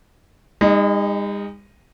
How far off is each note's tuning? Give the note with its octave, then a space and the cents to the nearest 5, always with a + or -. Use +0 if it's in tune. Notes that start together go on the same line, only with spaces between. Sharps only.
G#3 -45 D#4 +0